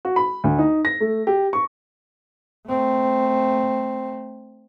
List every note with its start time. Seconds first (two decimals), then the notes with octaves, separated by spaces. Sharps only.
0.05 F#4
0.16 B5
0.44 D2
0.59 D#4
0.85 A#6
1.00 A3
1.27 G4
1.53 C#6
2.68 A3 C4